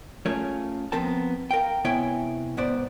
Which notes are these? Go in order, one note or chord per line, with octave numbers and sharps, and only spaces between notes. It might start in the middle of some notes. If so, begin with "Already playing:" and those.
A3 C#4 F4 G#4 A#4 C#5
F3 B3 C4 A#4 A5
A#4 F5 G5
C3 B3 E4 C#5 G5 G#5
C2 G#2 B3 C5 D5